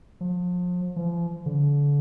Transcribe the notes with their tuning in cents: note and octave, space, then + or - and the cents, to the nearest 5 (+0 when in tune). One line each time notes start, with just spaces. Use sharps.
F3 +35
F3 -35
D3 -35